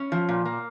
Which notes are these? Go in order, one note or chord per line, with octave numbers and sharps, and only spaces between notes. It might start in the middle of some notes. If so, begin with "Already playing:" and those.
Already playing: C#4
F3
A#2
A#3